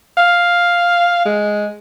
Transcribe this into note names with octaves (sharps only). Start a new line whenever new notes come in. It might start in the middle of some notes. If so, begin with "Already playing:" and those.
F5
G#3